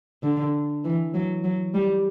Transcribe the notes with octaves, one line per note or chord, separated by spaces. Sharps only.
D3
E3
F#3
F#3
G3